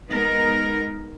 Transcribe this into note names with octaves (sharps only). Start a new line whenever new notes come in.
G#3 B3 D#4 A#4